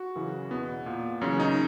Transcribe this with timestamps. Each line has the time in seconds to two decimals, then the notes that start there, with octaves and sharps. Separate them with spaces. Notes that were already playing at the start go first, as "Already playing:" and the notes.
Already playing: F#4
0.15 F#2 C#3 E3
0.51 E2 B2 B3
0.86 A#2
1.21 F#2 C#3 E3 C#4
1.40 D#4